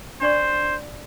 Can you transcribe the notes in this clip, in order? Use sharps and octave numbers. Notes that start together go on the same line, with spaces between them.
D4 C5 D5 C#6